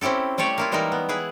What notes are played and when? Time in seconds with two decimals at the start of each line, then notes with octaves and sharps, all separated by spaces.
0.01 C4 C#4 E4 G4 A4
0.38 G3 A3 G4 C#5 D5
0.58 A#3 E4 F4
0.72 E3 G3 G#3 D#4 E4 A#4
0.92 B3
1.09 E4 G#4 B4